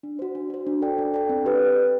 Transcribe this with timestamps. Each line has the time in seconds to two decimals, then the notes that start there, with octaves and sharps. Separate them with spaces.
0.03 D4
0.19 F#4 C5
0.35 D4
0.50 F#4 C5
0.67 D4
0.82 A4 D5 G5
0.98 D4
1.14 A4 D5 G5
1.29 C4
1.46 G4 B4